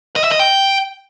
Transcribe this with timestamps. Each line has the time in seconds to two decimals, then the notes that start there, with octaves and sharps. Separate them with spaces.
0.16 D#5
0.24 E5
0.32 D#5
0.39 G5